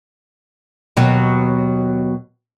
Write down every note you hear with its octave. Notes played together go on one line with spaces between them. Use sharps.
D#2 B2 F#3